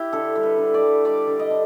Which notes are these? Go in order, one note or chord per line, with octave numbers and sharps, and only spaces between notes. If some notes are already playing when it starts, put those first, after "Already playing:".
Already playing: E4 G4
D3 A4
G3
B4
D3
D5
G3
G3 D5
D3
D#5
D3